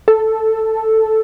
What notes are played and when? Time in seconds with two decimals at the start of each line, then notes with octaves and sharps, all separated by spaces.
0.08 A4